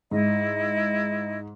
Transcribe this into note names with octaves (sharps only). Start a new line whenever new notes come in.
G#2 E4 D#5